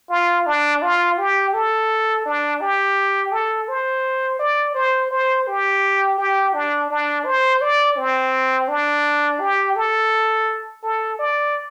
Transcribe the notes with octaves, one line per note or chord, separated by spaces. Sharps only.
F4
D4
F4
G4
A4
D4
G4
A4
C5
D5
C5
C5
G4
G4
D4
D4
C5
D5
C4
D4
G4
A4
A4
D5